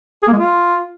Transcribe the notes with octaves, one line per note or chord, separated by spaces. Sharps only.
G#4
A#3
G#3
F4